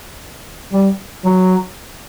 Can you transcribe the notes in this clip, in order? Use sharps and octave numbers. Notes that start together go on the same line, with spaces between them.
G3
F#3